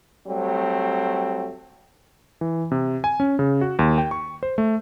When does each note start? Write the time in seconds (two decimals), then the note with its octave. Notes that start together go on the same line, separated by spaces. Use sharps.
0.27 F#3 G3 A3 C4
2.41 E3
2.71 C3
3.04 G#5
3.20 C#4
3.39 C#3
3.61 F#4
3.79 D#2
3.98 G5
4.11 C#6
4.43 C5
4.58 A3